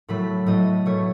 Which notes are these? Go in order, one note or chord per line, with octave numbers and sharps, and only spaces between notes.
A2 F#3 A3 B5
A2 F#3 A3 D#5
B2 A3 C#5